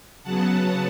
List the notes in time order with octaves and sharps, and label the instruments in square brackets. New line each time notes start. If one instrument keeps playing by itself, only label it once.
[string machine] C#3 F#3 B3 F#5 A5